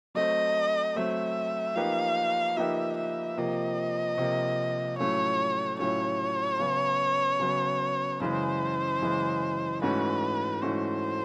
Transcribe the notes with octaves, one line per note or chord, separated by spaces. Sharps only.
F#3 A3 C4 D#5
F#3 A3 C4 E5
F3 A#3 D#4 G4 B4 F5
F3 A#3 D#4 G4 B4 E5
E5
C3 F3 A#3 D#5
C3 F3 A#3
A2 F#3 A3 C#4 F4 C#5
A2 F#3 A3 C#4 F4 C#5
C#3 F#3 B3
C#3 F#3 B3
F#2 C#3 E3 G#3 C5
F#2 C#3 E3 G#3
G#2 E3 A3 C#4 F#4 B4
G#2 E3 A3 C#4 F#4 C5